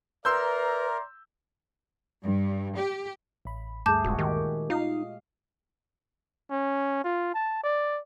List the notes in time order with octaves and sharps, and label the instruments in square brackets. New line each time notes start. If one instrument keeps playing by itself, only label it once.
[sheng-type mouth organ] A#4 [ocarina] B4 [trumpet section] D5 E5 A#5 [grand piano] C6 E6 G6
[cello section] G2
G4
[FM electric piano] A1 B5
[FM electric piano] D2 G2 [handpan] A3 G#4 [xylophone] A5 D6 G6
[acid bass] D#1 [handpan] A#2 G#3 F#4
[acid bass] D#3 [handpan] G4
[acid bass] D#4 [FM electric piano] F4 D#5 D#6 [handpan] F5
[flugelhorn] C#4
F4
A5
D5